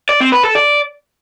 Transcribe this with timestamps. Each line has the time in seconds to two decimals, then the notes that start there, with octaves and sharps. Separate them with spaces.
0.09 D5
0.21 C4
0.32 B4
0.44 A4
0.55 D5